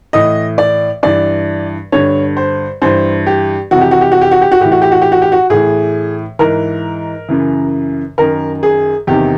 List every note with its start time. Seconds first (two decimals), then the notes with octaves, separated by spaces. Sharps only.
0.13 A2 E3 D#5
0.58 D5
1.03 G2 E3 D5
1.92 G2 D3 C#5
2.37 C5
2.82 G2 E3 C5
3.26 G4
3.71 F2 C3 E3 F#4
3.81 G4
3.91 F#4
4.01 G4
4.12 F#4
4.21 G4
4.31 F#4
4.41 G4
4.52 F#4
4.60 A2 E3 G4
4.72 F#4
4.82 G4
4.92 F#4
5.02 G4
5.12 F#4
5.22 G4
5.32 F#4
5.50 A2 E3 G#4
6.39 G#2 E3 A#4
7.29 F#2 C#3 E3
8.18 F#2 D#3 A#4
8.63 G#4
9.07 E2 C3 D#3 G4